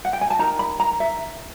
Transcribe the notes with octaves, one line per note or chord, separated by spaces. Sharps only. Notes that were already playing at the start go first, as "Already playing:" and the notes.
F#5
G5
G#5
A5
D#4 G4 A#4 A#5
B5
A#5
E5